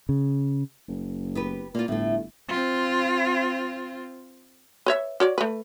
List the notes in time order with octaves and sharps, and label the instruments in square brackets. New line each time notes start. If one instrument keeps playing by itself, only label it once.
[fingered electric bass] C#3
[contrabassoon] F#1
[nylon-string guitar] B3 G4 B4
[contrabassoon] A#2 [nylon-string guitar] A#3 F4
[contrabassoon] G1 [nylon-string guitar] A2 A3
[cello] C4 F4
[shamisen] B4 C#5 E5
F#4 C#5 D5
A3 B4